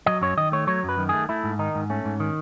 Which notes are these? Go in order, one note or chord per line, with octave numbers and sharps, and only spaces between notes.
F#3 D#5
F#2 C#5
D#3 D#5
A3 C#5
F#3 C#5
F#2 B4
D#3
A3 G#4
A3 E4
G#2
D#3 D#4
G#2
A3 C#4
G#2
D#3